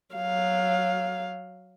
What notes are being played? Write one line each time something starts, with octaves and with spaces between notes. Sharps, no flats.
F#3 F5